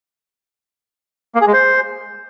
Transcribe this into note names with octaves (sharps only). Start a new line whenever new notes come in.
A#3
G#4
G#3
C5